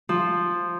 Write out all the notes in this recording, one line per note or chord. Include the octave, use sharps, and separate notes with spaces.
F3